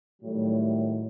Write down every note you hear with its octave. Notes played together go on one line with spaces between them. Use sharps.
A2 D#3 F#3 G3 A3